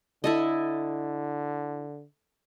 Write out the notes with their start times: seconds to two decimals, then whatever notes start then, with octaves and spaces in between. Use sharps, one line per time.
0.24 D3 E4 A4 D#5